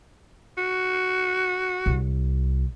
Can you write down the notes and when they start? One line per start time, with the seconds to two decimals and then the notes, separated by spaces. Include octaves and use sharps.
0.58 F#4
1.86 C2